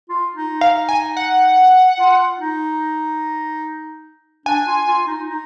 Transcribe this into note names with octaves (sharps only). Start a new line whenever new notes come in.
F4
D#4
F5
G#5
F#5
F4
D#4
D4 G#5
F4
F4
D#4
D#4